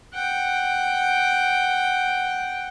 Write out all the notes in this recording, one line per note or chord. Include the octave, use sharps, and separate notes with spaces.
F#5 G5